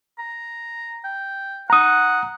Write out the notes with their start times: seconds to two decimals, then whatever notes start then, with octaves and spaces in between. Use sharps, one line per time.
0.19 A#5
1.04 G5
1.70 F#5 A#5 D#6